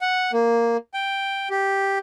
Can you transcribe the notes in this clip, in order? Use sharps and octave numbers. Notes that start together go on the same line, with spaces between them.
F#5
A#3
G5
G4